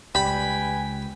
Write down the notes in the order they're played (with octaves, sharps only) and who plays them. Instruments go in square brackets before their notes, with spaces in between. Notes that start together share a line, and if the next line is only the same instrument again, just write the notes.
[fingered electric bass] C#2 [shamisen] G3 [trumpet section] B4 G5 G#5 [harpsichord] B5